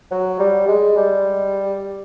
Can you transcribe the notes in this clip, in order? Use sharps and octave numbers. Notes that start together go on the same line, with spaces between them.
F#3
G3
G#3
G3